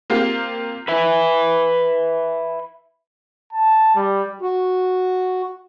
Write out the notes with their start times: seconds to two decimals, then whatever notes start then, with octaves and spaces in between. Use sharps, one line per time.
0.10 A#3 C4 F4 G4 F5
0.88 B4 E5
3.53 A5
3.96 G3
4.42 F#4